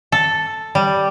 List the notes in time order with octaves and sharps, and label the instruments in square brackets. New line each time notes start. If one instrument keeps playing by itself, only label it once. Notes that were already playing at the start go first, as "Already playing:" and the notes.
[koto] A4
G3